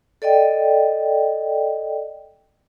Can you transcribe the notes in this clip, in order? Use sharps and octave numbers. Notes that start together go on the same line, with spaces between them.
A4 D5 D#5 G5